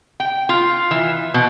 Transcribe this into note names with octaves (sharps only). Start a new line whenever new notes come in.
G5
F4
E3
B2